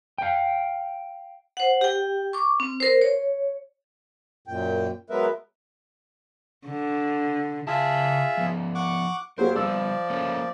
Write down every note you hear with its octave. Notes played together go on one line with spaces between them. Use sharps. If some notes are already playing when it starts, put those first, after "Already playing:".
F5 G5
C5 F#5
G4 G5
C#6 D6
C4
A#4 C5
C#5
F#2 A#2 G5
F#3 G#3 B3 A#4 B4 E5
D3
C#3 F4 G#4 E5 A5
F3 B3
F#5 C#6 D6
F#3 A#3 G4 G#4 A#4 C5
F3 G3 B3 D5 E6
A3 A#3 C#4